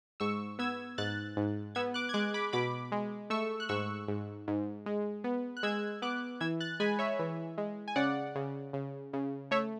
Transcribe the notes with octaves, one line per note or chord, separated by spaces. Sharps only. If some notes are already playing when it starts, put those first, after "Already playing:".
G#2 C#6 E6
B3 E6 G#6
G#2 F#6 A6
G#2
B3 E6 G#6
D6 F#6
G#6
G#3 D6 F#6
B5 D6
B2 B5 D6
G#3
A3 C#6 E6
F#6
G#2 C#6 E6
G#2
G#2
G#3
B3
F#6
G#3 E6 G#6
B3 D6 F#6
E3 E6 G#6
F#6 A6
G#3 G#5 B5
C#5 E5
E3
G#3
G#5
C#3 D5 F#5
C#3
C#3
C#3
A3 C#5 E5